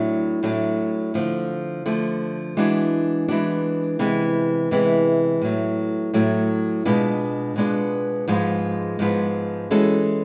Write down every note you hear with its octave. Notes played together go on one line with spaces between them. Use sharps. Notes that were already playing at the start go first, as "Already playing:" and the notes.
Already playing: A2 F#3 A3 D4
A2 F#3 A3 D4
D3 F3 A3
D3 F3 A3
E3 G#3 B3 D4 F#4
E3 G#3 B3 D4 F#4
C3 E3 G#3 B3
C3 E3 G#3 B3
A2 F#3 A3
A2 F#3 A3
B2 G#3 B3 D4 F4
B2 G#3 B3 D4 F4
G#2 F3 G#3 B3
G#2 F3 G#3 B3
E3 G#3 C#4 F#4 A4